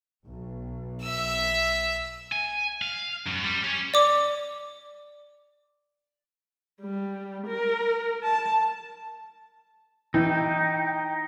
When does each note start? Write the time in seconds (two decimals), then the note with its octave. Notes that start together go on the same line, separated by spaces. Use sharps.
0.25 B1
1.02 E5 E6
2.32 G#5
2.82 F5
3.26 F#2
3.43 G3
3.63 C#4
3.94 D5 D6
6.82 G3
7.46 A#4
8.23 A5
10.14 E3 D#4 G5